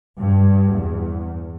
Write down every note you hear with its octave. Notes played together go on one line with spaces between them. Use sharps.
G2
E2